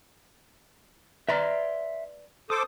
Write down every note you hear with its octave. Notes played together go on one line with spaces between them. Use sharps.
B4 D5 E5 A#5 C6 F6
A4 C5 D6 D#6